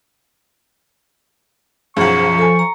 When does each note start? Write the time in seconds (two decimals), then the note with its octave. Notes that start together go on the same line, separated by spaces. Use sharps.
1.97 B1 F#2 F3 G#4 F#5 C#6
2.39 A4 G#5
2.59 A#5